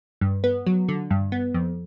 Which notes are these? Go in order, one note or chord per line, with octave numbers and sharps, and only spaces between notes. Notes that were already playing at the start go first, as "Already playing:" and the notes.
G2
B3
F#3
D3
G2
B3
F2